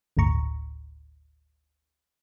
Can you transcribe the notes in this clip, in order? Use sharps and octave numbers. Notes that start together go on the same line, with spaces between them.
G1 D2 A2 A#5 C#6